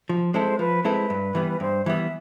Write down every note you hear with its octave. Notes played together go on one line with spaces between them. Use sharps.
F3
G#3 C4 E4 A4 C5
F3 B4
G#3 C4 E4 A4 B4
G2
E3 G3 B3
G2 C5
E3 G3 B3 E5